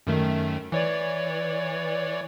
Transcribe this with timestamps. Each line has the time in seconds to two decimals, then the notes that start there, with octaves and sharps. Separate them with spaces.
0.07 F#2 D#3 A3
0.72 E3 C#5 D5